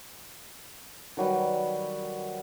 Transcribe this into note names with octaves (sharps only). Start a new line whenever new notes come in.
D#3 F#3 G3 B4